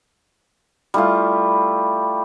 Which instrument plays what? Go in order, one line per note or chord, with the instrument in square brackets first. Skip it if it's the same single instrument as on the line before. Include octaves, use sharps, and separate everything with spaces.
[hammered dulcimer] G3 A3 E4 F4